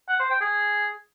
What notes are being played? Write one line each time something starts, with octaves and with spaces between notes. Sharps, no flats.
F#5
C5
G5
G#4